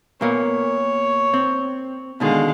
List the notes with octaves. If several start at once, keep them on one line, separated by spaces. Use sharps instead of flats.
A#2 A#3 B3 C#5
C4
B2 D3 D#3 G#3 F5